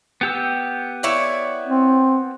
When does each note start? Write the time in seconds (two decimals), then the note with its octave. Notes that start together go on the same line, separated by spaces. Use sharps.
0.21 B3 G4 E6
1.03 E4 C#5 D5
1.67 C4